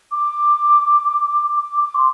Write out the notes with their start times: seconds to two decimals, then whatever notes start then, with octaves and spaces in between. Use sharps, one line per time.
0.11 D6
1.57 D6
1.81 D6
1.95 C6